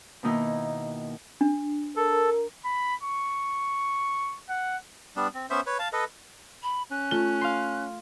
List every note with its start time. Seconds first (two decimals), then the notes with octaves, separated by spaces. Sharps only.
0.23 B2 D#3 A#3 D#4 E4
1.41 D4
1.96 A4 A#4
2.65 B5
3.03 C#6
4.49 F#5
5.16 G3 B3 D4
5.34 C4
5.50 B3 C#4 C5 E5
5.66 B4 C#5
5.79 F5 A5
5.93 A4 B4 D#5
6.63 B5
6.91 C#4 F#6
7.11 A3 F4
7.41 F5 C6